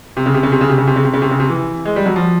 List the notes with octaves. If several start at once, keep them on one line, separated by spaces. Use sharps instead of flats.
C3
C#3
C3
C#3
C3
C#3
C3
C#3
C3
C#3
C3
C#3
C3
C#3
C3
E3
G#3
G3
F#3
F3